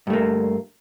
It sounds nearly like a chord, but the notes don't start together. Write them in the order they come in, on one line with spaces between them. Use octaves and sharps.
G2 A3 A#3